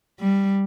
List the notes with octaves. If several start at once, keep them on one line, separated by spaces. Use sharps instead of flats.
G3